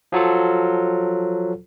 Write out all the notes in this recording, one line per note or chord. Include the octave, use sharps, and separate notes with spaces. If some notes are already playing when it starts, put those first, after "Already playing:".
F3 F#3 F4 A4